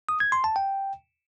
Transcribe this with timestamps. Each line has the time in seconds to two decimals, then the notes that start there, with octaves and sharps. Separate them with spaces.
0.09 D#6
0.20 G#6
0.32 C6
0.44 A5
0.56 G5